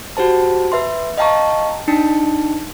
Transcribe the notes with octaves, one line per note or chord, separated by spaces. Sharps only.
F#4 G4 C5 A5
B4 E5 C6
D#5 F5 G5 A5 A#5 C#6
D4 D#4 A5 C#7